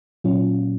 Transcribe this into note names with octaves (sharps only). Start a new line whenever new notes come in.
A#2 F#3 C#4 F4